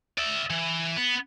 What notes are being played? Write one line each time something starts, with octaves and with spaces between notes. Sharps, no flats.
D5 E5
E3
B3